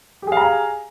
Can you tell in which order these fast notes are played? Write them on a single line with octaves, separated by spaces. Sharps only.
G4 G#4 F5 A#5 G#5